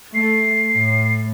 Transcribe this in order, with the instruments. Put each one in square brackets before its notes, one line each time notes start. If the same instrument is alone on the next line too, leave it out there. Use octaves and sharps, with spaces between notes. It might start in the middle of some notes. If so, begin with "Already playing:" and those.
[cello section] A3 [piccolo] C7
[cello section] A2